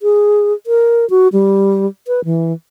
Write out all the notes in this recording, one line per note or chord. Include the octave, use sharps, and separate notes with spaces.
G#4
A#4
F#4
G3
B4
E3